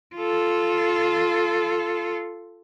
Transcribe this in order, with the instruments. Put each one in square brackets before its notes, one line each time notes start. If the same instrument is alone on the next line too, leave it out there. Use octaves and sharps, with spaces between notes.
[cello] F4 A4